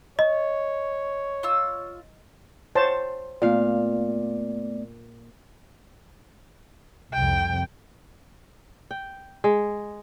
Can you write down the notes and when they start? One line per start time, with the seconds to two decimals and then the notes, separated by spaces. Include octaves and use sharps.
0.19 C#5 D#5
1.43 F4 E6
2.75 C5 C#5 A5
3.42 A#2 A3 B3 D5 F5
7.13 C2 F2 G5
8.91 G5
9.44 G#3